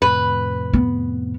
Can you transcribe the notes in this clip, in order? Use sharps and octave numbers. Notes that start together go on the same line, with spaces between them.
F2 A2 C3 B4
B3